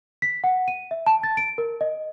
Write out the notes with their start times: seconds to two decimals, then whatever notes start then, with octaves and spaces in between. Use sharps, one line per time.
0.22 B6
0.44 F#5
0.68 D#7
0.91 E5
1.06 A5
1.23 A6
1.37 D7
1.58 A#4
1.81 D#5